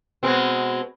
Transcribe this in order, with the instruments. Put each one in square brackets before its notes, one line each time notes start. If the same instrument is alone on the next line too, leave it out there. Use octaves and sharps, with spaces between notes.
[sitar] B2 G#3 C4